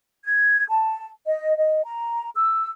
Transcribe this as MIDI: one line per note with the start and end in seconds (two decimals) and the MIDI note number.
0.25 0.64 92
0.69 1.07 81
1.26 1.56 75
1.57 1.82 75
1.84 2.29 82
2.35 2.70 88